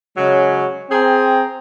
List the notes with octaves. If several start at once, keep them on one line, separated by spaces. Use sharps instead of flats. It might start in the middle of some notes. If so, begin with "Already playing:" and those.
C#3 F#3 G#3 C#4
C4 G#4 G5 A#5